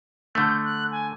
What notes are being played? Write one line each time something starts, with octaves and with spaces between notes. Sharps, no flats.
D3 A3 G6
F#6
G#5